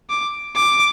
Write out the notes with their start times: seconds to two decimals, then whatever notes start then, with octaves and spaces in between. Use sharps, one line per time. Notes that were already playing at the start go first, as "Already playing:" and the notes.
0.10 D6
0.55 D6